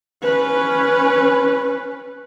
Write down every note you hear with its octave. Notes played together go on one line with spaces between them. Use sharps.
C#4 B4